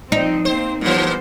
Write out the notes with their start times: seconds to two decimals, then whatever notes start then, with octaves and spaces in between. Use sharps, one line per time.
0.12 F3 C4 D#4
0.45 A#3 C4 C5
0.81 A#2 E3 G3 B3 C5